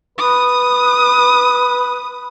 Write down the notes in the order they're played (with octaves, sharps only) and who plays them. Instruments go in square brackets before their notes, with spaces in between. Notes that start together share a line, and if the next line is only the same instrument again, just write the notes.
[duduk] B4 [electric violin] D#6